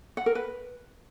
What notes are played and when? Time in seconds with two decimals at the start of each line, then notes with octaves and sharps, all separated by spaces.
0.17 F#5
0.26 A#4
0.35 B4